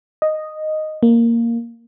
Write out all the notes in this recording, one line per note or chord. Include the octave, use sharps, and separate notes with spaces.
D#5
A#3